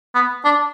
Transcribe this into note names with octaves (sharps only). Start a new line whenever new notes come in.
B3
D4